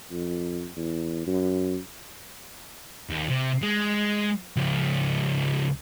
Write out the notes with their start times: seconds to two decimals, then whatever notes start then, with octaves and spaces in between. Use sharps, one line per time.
0.11 F2
0.77 E2
1.27 F#2
3.10 D#2
3.29 C3
3.62 G#3
4.57 C#2 F3